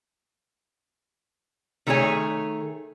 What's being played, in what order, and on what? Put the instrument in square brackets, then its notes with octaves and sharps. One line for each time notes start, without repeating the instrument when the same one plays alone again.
[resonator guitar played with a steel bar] D#3 A3 D4 G#4 C#5 G#5